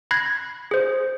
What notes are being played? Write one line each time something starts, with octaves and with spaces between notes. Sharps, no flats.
B5 F#6 G#6 A#6 C7
G#4 C5